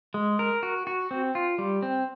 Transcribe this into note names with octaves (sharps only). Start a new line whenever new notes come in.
G#3
A#4
F#4
F#4
C4
F4
G3
C4